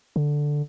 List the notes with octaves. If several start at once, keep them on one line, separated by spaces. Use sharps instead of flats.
D3